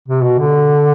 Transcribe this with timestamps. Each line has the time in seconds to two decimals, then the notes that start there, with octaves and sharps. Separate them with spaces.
0.08 C3
0.23 B2
0.39 D3